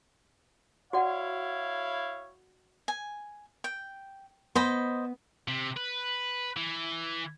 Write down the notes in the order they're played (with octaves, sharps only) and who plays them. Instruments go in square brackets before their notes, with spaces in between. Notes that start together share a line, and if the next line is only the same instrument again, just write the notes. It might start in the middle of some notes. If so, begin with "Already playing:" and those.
[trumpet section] E4 C#5 F5 [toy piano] F#4 D5 F#5
[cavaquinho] G#5
G5
[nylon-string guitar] B3 [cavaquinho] C5 D#5 B5
[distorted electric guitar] C3
B4
E3